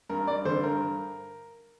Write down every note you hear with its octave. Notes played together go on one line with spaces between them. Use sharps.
G2 A#4
G2 D5
D3 C5
G2 A#4